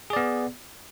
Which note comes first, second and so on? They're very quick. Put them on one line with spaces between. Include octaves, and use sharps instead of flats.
G#4 D5 B3